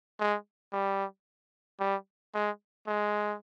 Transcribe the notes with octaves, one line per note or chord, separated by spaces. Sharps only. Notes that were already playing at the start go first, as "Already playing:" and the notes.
G#3
G3
G3
G#3
G#3